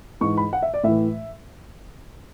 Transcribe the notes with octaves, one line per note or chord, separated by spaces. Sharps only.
G#2 E3 C#6
B5
F#5
E5
D5
A2 E3 E5